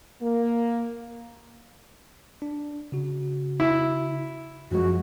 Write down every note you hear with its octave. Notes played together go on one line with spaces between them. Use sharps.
A#3
D4
C#3 F#4
E4
F#2 F3 G#3 F#4